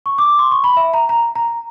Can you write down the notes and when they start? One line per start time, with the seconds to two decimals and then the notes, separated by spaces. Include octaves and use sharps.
0.06 C#6
0.18 D6
0.39 C6
0.52 C#6
0.64 B5
0.77 E5
0.94 A#5
1.09 A#5
1.35 A#5